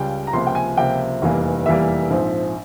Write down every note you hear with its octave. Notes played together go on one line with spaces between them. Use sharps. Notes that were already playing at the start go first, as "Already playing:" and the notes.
Already playing: C#2 C#3 G3 G5
A#5
C#2 C3 F3 A#3 C6
G5
G#5
C#2 C3 F3 A#3 G5
F1 E2 E3 G3 A#3
F1 E2 E3 G3 A#3 E5
A#1 G#2 F3 C4